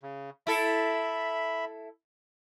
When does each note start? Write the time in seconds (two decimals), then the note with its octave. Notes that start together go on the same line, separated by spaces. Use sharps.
0.03 C#3
0.47 E4 A4 E5 B5